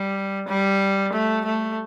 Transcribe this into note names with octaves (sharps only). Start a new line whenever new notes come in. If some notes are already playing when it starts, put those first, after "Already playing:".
Already playing: G3
G3
A3
A3